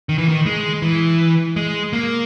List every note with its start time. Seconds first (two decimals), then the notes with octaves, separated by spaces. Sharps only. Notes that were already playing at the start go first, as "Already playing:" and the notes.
0.09 D#3
0.18 E3
0.28 D#3
0.46 G#3
0.82 E3
1.56 G#3
1.93 A#3